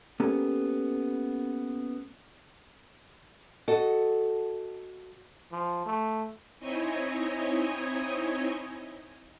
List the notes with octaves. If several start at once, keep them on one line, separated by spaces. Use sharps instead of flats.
A#3 B3 C#4 G4 A4
F#4 A4 D#5
F3
A3
C4 D#4 E4 C#5 D#5 G#5